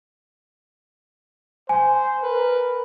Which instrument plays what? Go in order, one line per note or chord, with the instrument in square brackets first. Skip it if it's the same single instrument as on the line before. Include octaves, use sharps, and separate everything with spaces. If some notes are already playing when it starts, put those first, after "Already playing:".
[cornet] C5 [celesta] G#5
[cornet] A#4 [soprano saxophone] B4